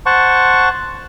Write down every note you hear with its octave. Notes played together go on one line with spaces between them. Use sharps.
C5 F#5 A5 C#6